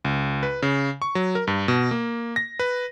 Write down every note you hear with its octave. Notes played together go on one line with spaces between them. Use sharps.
C#2
B4
C#3
C#6
F#3
A#4
G2
B2
A#3
A#6
B4